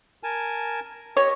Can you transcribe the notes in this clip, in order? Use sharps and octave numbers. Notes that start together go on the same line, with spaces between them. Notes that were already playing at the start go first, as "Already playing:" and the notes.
A#4 G#5 A5
G4 C#5 D#5